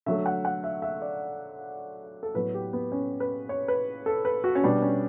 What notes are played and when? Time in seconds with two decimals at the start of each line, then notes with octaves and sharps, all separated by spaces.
0.06 D3 F#3 A3 E5
0.26 F#5
0.45 F#5
0.64 E5
0.82 E5
1.02 D5
2.23 A4
2.34 A2 F#3 B3 B4
2.54 G4
2.73 B3
2.92 C#4
3.20 B4
3.49 C#5
3.68 B4
4.06 A4
4.25 B4
4.44 F#4
4.55 C#4
4.64 B2 G3 B3 D4
4.82 C#4